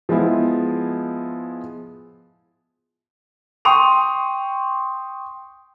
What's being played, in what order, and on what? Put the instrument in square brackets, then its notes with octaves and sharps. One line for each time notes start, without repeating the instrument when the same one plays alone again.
[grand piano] F3 G#3 B3 E4
[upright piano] G5 C6 C#6 D#6 F7